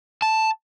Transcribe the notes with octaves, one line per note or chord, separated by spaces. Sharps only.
A5